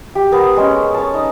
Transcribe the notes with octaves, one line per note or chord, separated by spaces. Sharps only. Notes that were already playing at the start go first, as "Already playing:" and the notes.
G4
B3 A#4
G#3 C#4
C#5 A5
D#4